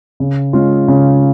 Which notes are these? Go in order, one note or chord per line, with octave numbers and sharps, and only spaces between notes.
C#3
G#3 C#4 F4
C#3